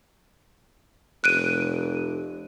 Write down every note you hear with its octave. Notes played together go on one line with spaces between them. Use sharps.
F1 F#6 D7 D#7